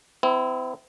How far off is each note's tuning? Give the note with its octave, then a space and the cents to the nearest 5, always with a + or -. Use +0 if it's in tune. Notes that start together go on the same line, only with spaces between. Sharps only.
C4 -35 E4 +0